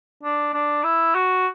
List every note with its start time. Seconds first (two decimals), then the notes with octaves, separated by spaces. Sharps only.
0.24 D4
0.54 D4
0.84 E4
1.15 F#4